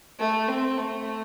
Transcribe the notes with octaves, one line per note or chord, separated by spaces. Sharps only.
A3
C4
A3